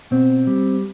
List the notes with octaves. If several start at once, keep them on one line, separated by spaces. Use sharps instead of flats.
B2 C4
G3